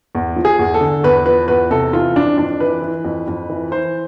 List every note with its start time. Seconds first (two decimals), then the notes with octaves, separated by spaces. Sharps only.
0.15 E2
0.36 F3
0.45 G#4
0.59 E2
0.74 A4
0.81 D3
1.04 E2 B4
1.26 F3 B4
1.48 E2 B4
1.71 C3 A4
1.93 E3 F4
2.16 F2 D4
2.37 F2 D4
2.60 E3 B4
2.82 E3
3.05 F2
3.28 F2
3.50 E3
3.71 E3 C5